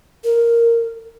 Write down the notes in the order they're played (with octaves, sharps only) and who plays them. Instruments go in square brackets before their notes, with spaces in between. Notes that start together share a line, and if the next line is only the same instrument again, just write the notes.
[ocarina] A#4